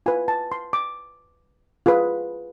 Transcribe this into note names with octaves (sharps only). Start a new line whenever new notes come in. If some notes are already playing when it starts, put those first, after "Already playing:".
F4 B4 G#5
A5
C6
D6
F4 G#4 B4